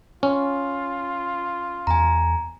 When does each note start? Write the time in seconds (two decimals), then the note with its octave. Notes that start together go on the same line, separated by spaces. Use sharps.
0.23 C#4 F4
1.87 E2 G#5 A#5